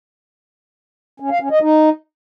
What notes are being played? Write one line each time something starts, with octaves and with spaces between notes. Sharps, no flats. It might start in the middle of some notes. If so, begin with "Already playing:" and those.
C#4
F5
C#4
D#5
D#4